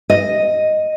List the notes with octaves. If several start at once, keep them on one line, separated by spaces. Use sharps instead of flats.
D#5